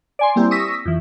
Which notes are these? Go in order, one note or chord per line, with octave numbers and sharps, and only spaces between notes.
D5 G#5 C6
G3 A#3 C4 E4 G4
C#6 D#6 E6 A#6 B6
F2 E3